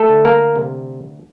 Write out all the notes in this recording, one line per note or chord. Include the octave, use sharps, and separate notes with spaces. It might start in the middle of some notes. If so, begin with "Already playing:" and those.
Already playing: A3 A4
D2
A#3 A#4
C3